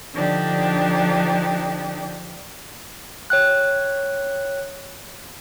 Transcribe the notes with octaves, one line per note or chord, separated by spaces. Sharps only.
D3 F3 D4 D#4 G4
C#5 G5 F#6